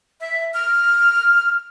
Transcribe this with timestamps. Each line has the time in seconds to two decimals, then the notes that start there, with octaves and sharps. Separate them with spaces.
0.21 E5
0.54 F6